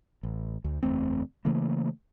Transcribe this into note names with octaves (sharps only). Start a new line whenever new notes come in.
A1
D2
F#1 E2 A3 C4
C#3 E3 A3 A#3